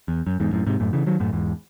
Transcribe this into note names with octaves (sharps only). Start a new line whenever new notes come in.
E2
F#2
E2 G#2
F#2 A2
G#2 C3
F#2 A2
C#3 E3
D#3 F#3
F#2 A2
E2 G#2